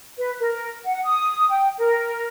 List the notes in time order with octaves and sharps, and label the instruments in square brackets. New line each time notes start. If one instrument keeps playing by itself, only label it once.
[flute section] B4
A#4
F#5
D#6
G5
A#4